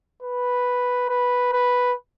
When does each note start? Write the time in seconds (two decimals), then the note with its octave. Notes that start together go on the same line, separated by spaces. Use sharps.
0.23 B4
1.09 B4
1.53 B4